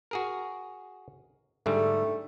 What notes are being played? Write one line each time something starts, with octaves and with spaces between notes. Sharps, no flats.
F#4 G#4 A#4
G#2 D3 G3 A3